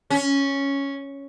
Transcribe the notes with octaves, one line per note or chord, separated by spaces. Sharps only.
C#4